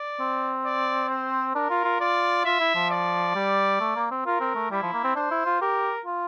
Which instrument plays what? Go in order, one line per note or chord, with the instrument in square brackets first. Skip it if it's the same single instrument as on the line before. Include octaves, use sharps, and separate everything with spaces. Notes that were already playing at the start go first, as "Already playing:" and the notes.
Already playing: [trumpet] D5
[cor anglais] C4
[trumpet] D5
C5
[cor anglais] D4 [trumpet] A#4
[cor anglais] F4
F4
[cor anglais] F4 [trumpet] D5
[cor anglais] F4 [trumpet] E5
[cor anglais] E4
F3
[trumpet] D5
[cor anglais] G3
A3
A#3
C4
[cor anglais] F4 [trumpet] A#4
[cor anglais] C4
A3
[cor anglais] G3 [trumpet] E4
[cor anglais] F3
A#3
C4
[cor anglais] D4 [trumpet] C5
[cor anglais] E4
F4
[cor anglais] G4 [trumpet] A#4
[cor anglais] F4